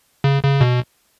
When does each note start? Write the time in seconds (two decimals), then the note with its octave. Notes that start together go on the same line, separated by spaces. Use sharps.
0.24 C#3
0.43 C#3
0.61 B2